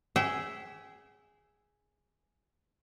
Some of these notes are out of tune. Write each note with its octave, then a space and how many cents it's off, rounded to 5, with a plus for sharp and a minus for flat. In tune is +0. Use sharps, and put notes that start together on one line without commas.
G#4 +0 E5 +0 G5 -40